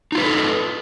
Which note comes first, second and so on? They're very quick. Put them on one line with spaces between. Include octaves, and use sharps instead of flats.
D#4 F4 B4 G4 A4